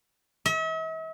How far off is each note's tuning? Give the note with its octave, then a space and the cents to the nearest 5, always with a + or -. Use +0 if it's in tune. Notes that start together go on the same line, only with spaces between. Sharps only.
E5 -45